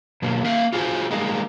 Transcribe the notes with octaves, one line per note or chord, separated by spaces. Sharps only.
B2 F#3 A#3
A#3 E5 F5
F4 F#4 G#4 A4 C5
G3 G#3 A#3 D#4 A#5